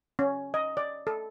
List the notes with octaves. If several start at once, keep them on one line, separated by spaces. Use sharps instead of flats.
C#4
D#5
D5
A4